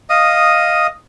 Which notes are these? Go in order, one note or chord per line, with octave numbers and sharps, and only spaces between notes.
D#5 F5 D#6